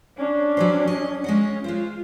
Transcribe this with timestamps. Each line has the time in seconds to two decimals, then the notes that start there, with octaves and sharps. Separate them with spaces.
0.17 C#4 D4
0.57 F#3 G4 C5
0.87 D#5
1.24 G#3 C#4 D#5 F#5
1.64 G#3 F4 C5